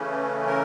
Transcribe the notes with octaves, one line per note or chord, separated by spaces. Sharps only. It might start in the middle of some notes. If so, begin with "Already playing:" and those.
Already playing: C#3 E3 A3 C#4
A#4